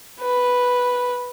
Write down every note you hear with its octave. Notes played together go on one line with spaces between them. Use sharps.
B4